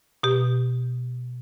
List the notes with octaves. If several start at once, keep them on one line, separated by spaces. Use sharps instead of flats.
B2 G4